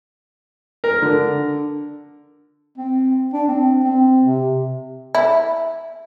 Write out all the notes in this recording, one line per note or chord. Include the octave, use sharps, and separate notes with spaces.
A#4
D3
C4
D4
C4
C4
C3
E4